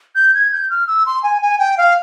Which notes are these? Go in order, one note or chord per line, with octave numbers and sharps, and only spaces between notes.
G6
G#6
G6
F6
E6
C6
G#5
G#5
G5
F5